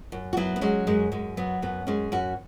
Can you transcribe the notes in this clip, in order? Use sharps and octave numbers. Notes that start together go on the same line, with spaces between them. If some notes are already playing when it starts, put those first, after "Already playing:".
F#2
F#4
F#3 B3 E4
B3
F#3 G#3 C#4
F#2 G#3
F#2 G#3
F#3 B3
F#2 B3
F#2 G#3 C#4
F#2 C#4 F#4